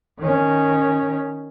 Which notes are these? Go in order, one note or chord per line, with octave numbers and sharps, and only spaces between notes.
D#3 C#4